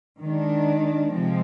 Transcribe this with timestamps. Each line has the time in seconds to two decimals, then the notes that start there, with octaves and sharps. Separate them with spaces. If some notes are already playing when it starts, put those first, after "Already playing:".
0.21 D#3 G#3 D4
1.12 C3 F3 G#3 C4